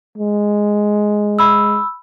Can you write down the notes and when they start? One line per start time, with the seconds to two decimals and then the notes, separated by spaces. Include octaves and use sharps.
0.18 G#3
1.39 B5 E6